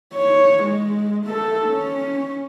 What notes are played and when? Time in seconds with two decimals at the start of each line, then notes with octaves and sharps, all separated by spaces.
0.14 C#5
0.64 G#3
1.26 A3 A4
1.68 C#4